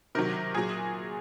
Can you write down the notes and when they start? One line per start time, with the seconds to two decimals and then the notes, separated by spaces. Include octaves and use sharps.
0.15 C3 D#3 F#3 A#4
0.54 A#2 F#3 G#4